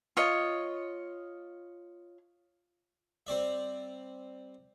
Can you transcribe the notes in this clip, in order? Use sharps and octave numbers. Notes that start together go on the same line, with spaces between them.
F4 C#5 D#5
G3 C4 D5 E5